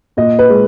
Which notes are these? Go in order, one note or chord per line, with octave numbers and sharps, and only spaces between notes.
A#2 D#5
B4
G#3